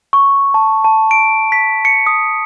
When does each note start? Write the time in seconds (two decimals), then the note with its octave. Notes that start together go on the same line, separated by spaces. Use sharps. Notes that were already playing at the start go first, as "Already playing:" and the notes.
0.13 C#6
0.54 A5
0.84 A5
1.11 D7
1.52 B6
1.85 C#7
2.07 D#6